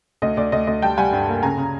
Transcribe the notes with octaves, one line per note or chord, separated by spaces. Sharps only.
D2 D#5
D2 D5
D2 D#5
D2 D#5
G3 G5 A5
G3 F#5 G#5
G2
A#3
C#3 G#5 A#5
C#3